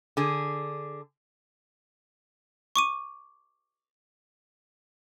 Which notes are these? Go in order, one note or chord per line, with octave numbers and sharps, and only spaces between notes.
D3 G#4
C#6 D6 D#7